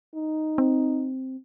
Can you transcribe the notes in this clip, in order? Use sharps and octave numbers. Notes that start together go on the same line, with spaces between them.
D#4
C4